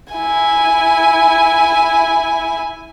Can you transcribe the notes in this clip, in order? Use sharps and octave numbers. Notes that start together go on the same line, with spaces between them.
E4 G#5